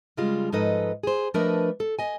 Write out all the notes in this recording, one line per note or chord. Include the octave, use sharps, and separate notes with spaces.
C#3 G3 G#3 F4
G#2 F3 D#4 A4 B4 D#5
G#4 C5
F3 A3 D4 A#4 B4 D#5
A4
D#5 G#5